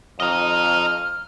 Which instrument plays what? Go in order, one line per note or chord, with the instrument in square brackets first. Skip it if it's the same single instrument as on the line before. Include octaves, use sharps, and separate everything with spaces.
[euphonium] F2 [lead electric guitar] D#5 A#5 [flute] F6